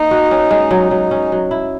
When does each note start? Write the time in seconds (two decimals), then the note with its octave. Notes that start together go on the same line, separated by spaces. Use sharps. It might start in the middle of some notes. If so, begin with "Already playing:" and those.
Already playing: A#3 D#4
0.11 F#4
0.31 C#4
0.51 G#3
0.71 F#3
0.91 F#3
1.11 C#4
1.32 F#3
1.51 E4